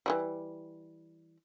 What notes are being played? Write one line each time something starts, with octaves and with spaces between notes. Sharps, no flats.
E3 F#3 G3